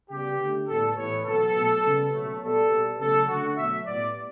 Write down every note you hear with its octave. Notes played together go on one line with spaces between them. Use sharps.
C#3 G3 B3 G4
D3 A3
A2 G3 B3 A4
A2 E3 B3 C#5
B2 F#3 B3 A4
B2 F#3 A3
C#3 G3 B3
B2 F#3 A3
B2 G3 B3 A4
B2 G3 B3
C#3 F#3 A3 A4
D3 A3 F#4
B2 F#3 A3 E5
A2 G3 B3 D5